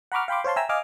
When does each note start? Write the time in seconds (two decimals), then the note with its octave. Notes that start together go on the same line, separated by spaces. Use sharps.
0.12 F#5 A#5 B5 C#6 D6 F6
0.28 F5 G5 B5 C6 D6
0.44 C5 C#5 F5 A5 C6
0.56 E5 G5 G#5 A#5 E6
0.69 D#5 F5 G#5 D6 F6